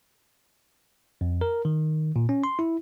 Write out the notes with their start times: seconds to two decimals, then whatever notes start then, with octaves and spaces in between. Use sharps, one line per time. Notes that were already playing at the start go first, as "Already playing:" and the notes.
1.21 F2
1.41 A#4
1.65 D#3
2.16 A#2
2.29 C#4
2.44 C6
2.59 E4